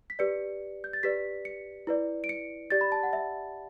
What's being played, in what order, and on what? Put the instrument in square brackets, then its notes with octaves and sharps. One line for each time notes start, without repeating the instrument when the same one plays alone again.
[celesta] B6
G4 B4 D5 C#7
G6
A6
G4 B4 D5 B6
C#7
E4 B4 D5
D7
C#7
G4 D5 A6
B5
A5
F#5
E5